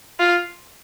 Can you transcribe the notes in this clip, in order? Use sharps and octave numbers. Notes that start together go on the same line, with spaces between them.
F4